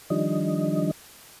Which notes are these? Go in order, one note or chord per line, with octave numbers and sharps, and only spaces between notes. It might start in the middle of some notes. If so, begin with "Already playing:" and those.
D#3 F3 G3 D4 D#5